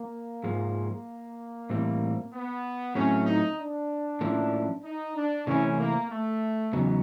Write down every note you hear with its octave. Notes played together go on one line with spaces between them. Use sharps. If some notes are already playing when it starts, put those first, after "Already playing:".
Already playing: A#3
G#2 F3 G#3
A2 E3 G3 C4
B3
A2 F#3 A3 C4 C#4
D#4
D4
A2 F3 A#3 C#4 E4
D#4
D4
C3 E3 A3 C4 C#4 E4
A#3
A3
E2 C#3 F#3 B3 D#4